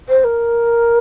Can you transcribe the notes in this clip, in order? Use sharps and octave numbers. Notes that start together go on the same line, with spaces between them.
C5
A#4